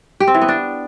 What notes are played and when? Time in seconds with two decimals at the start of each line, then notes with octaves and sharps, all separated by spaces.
0.20 G4
0.27 C4
0.34 E3
0.41 B3
0.49 D4